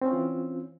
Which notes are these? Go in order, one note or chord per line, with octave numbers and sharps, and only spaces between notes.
E3 C4 C#4 F4